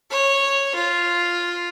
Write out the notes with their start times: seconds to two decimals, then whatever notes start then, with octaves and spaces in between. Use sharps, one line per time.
0.11 C#5
0.75 F4